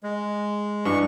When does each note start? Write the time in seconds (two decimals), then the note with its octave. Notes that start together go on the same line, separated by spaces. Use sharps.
0.03 G#3
0.85 G2 E3 C#6